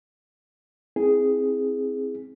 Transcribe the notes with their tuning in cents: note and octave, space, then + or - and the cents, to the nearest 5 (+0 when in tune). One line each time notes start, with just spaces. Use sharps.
C4 +5 E4 -25 G#4 +0